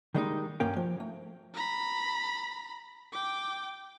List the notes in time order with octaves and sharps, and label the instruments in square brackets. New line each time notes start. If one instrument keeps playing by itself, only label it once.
[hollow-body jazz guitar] D#3 G3 G#3 A#3 D4 D#4
B1 G2 A#3 C#4 G5
F3
A3
[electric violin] A#5 B5
G5 D6